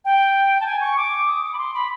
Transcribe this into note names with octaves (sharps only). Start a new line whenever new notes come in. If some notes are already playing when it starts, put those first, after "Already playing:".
G5
A5
G#5
C#6
D6
D#6
D6
B5
C6
B5